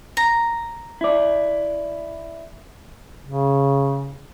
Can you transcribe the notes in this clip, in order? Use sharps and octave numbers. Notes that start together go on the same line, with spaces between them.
A#5
E4 D5
C#3